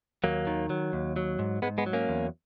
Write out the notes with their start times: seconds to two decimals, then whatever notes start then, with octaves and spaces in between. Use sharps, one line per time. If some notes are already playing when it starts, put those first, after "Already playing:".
0.24 D#2 F#3 A#3
0.47 D#3
0.70 F#3
0.93 D#2
1.16 F#3
1.39 G#2
1.62 G#2 G#3 B3
1.78 G#3 B3
1.86 F#3
1.93 A#3 C#4
2.09 E2